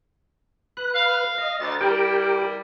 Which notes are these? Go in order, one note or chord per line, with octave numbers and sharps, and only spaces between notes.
B4 F#6
F5
D#5
D2 A6
G3 E4 G4 A#4 G5